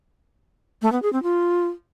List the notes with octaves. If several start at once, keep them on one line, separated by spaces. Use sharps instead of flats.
A3
B3
G#4
C4
F4